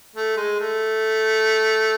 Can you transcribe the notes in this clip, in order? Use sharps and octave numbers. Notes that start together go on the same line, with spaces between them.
A3
G#3
A3